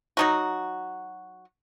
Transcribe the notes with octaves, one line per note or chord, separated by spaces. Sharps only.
F#3 D#4 F#4